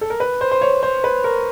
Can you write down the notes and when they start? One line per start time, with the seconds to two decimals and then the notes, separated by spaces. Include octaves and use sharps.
0.01 A4
0.10 A#4
0.20 B4
0.41 C5
0.51 C5
0.61 C#5
0.83 C5
1.04 B4
1.24 A#4